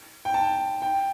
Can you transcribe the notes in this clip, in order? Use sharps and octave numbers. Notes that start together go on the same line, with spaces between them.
G5
A5
G5